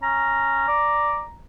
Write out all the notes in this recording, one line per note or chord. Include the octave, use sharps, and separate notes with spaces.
C#4 A#5
D5